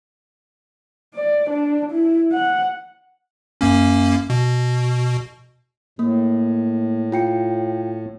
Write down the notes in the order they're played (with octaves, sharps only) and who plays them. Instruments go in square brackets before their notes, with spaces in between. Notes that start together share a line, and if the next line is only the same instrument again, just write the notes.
[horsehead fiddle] D5
D4
E4
F#5
[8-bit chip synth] F#2 A#3 C#4
B2
[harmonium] A2 [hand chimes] A#3
[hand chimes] F4 G5 C#7